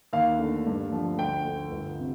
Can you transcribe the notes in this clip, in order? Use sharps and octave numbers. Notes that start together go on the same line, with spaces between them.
D#2 F5
D3 A3
G2
D3 F3 A3
D2 G5
D3 A3
G1
C3